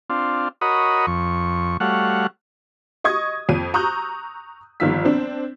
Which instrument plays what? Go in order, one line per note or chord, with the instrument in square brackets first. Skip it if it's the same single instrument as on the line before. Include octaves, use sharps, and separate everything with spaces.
[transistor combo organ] C4 D4 F4
F#4 A#4 C#5 D#5 B5 D#6
F2 C#6
G3 A3 F#4 C#5 F5 F#5
[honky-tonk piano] D#5 C#6 D#6 G#6
F2 D#7
A#5 C#6 D#6 E6 F#6 G6
G1 D#3 F3 F4 E6 B6
C4 D4